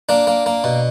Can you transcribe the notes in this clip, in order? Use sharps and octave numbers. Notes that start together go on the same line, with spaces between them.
A#3 D4
A#3
A#3
B2